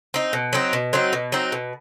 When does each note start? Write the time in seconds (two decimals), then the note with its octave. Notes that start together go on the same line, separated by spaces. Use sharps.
0.14 C4 D#4
0.33 B2
0.53 F#3 C4 D#4
0.73 B2
0.93 F#3 C4 D#4
1.13 B2
1.32 F#3 C4 D#4
1.52 B2